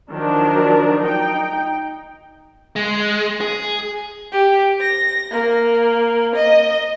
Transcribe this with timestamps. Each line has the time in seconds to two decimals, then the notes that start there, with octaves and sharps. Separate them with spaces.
0.12 D#3 F3 F#3 D4 A#4
0.99 D#4 G5
2.76 G#3
3.41 G#4
4.33 G4
4.81 A#6
5.32 A#3
6.35 D#5